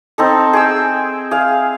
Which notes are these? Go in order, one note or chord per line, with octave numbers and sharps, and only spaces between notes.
C4 D#4 A4
G#4 G5 E6
G#4 F5